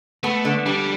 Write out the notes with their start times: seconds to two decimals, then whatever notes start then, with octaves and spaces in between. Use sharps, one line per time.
0.24 A3 B3
0.45 D3
0.66 G3 D4